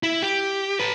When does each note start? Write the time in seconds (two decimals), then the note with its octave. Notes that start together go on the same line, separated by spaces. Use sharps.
0.03 E4
0.22 G4
0.80 A4 B4